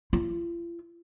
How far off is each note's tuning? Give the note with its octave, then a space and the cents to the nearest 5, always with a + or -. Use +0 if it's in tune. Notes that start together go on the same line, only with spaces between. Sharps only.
F4 -45